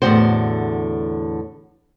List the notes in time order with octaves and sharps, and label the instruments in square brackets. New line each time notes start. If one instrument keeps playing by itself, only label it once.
[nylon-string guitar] E2 A2 D3 F3 F#4 C5